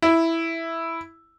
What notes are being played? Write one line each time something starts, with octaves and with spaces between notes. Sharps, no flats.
E4